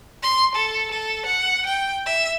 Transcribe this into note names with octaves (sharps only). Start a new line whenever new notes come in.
C6
A4
A4
F#5
G5
E5